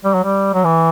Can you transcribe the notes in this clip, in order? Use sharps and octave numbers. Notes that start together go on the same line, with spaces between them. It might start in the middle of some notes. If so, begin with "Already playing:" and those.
G3
F#3
G3
F#3
E3